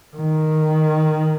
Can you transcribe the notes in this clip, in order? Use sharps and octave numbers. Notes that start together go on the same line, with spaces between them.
D#3